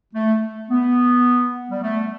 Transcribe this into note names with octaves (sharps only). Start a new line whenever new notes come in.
A3
B3
G3
A3